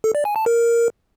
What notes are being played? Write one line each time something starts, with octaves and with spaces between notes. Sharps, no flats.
A4
D5
G#5
A5
A#4